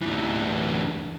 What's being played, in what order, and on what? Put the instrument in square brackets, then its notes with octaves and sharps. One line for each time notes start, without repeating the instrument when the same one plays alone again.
[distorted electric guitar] D2 E3